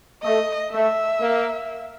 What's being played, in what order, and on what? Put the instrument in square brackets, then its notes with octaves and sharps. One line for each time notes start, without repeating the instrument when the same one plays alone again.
[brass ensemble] A3 [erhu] D#5
[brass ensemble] A3 [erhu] E5
[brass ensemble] A#3